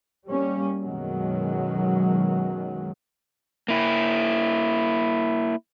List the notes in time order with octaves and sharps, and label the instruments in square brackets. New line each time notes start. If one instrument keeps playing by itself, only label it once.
[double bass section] G3 A#3 C#4
F#2 B2 D#3 F#3 G#3
[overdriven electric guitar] A#3 E4